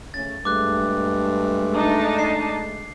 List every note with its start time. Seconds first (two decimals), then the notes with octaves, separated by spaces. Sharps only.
0.14 C#3 A3 C#4 A6
0.45 G2 G#3 A3 D6 F#6
1.75 D4 D#4 A5
2.19 C7